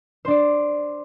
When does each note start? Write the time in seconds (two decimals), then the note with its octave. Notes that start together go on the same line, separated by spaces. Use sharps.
0.25 C5
0.28 D4
0.31 D5